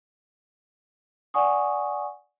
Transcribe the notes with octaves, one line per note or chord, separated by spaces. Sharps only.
D5 F#5 G#5 C#6 D#6